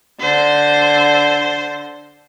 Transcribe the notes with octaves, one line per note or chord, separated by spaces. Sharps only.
D3 C5